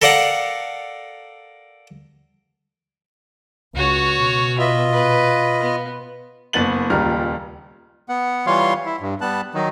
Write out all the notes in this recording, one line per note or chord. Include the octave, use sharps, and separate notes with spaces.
A4 A#4 D5 F5 F#5
C#2 F#4 C#5
B2
F4 B4 D#5 E5
B4
B3
F#1 B3 A6 F#7
D#1 C#2 G3 A#5 F6
B3 F#5
E3 G3 F4 C#5 F5 C6
E4
G2
G3 B3 A5 F#6
D#3 F#3 D#4